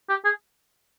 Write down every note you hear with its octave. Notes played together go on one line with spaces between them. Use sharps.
G4
G#4